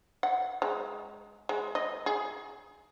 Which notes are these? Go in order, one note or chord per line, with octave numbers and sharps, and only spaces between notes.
F#5
G#3
G#3
D#5
G#4